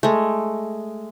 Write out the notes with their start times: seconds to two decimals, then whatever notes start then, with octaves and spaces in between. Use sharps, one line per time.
0.03 G#3 A3